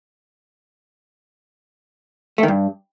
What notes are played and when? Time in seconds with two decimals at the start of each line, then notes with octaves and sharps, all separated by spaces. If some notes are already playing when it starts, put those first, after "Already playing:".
2.38 A3
2.43 D#3
2.48 G2